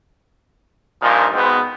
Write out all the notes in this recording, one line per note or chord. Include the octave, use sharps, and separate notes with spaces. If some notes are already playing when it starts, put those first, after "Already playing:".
G2 A#2 D#3 F3
G#2 B2 B3 C4